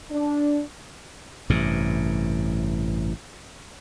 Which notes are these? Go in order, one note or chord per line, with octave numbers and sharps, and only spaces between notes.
D4
A1 G2 C3